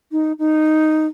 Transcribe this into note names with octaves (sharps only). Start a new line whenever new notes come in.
D#4
D#4